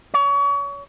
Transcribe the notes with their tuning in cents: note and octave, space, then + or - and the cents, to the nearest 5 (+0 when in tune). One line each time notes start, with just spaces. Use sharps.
C#5 +30